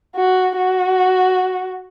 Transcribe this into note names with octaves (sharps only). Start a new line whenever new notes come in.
F#4
F#4